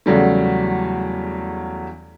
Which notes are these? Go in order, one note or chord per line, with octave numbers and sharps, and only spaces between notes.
E2 C#3 F#3 G3 A3